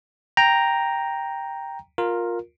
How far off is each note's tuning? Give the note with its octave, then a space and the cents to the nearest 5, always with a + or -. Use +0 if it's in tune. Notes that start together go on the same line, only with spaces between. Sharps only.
G5 +5 A#5 +0
F4 +15 A#4 +0